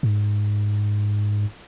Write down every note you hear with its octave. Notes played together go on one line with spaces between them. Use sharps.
G#2